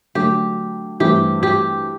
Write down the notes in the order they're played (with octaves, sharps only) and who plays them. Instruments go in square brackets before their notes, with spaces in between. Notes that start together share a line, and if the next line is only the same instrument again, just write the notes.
[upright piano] D3 F#3 A3 [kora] G4
[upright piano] G2 E3 A3 C4 E4 [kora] G4
[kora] G4